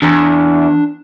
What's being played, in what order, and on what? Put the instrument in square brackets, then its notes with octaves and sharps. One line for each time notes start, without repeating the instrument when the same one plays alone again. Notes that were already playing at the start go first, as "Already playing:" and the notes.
[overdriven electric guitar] E2 [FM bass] D4